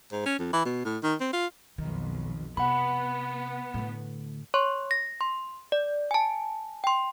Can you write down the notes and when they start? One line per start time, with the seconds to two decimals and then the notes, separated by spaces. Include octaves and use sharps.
0.12 G#2
0.26 C#4
0.39 F2
0.53 E3
0.65 B2
0.85 A2
1.03 D#3
1.21 C4
1.33 F4
1.78 B1 F2 D#3
2.57 C3 B3 F#5 B5
3.74 A2 D3
4.54 C#5 C6 C#6
4.91 A#6
5.21 C6
5.72 D5
6.11 G#5 A5
6.84 G5 C6